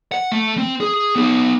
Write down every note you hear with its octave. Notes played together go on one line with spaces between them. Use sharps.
F#5
A3
C4
G#4
B3 D#4